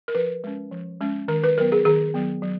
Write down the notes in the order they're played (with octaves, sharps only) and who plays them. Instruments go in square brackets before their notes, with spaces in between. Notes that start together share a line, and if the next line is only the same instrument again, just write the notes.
[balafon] A#4
F3 B4
G#3 C#4
F3
G#3 C#4
D#3 A#4
B4
F#3 B3 A#4
G#4
D#3 G#4
F#3 B3
F#3